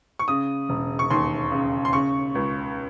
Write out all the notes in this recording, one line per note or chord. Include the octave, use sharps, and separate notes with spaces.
C#6
C#3 D#6
E1
C#6
D#2 C6
C#3
C6
C#3 C#6
C#2